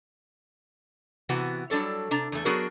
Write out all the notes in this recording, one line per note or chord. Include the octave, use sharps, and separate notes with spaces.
C3 E3 B3 F#4
F#3 G3 D4 A4 C#5
C3 D4 A#5
E2 A3
F#3 B3 D4 F#4 G#4 A#4